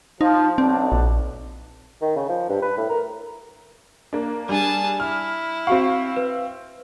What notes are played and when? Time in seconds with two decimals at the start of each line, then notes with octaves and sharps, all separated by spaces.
0.21 F3 D#4
0.58 B1 C4 D4
0.92 A#1
2.02 D#3
2.16 C#3
2.29 F3
2.49 G2
2.62 B4
2.78 A2
2.89 A#4
4.13 A#3 D4
4.49 G3 D4 G#4 A5
5.00 E4 F6
5.67 C4 F#4 F5 C#6
6.16 B4